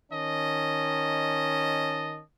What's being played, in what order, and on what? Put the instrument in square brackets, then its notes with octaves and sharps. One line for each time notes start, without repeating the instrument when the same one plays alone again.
[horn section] D#3 C#4 D#5 A5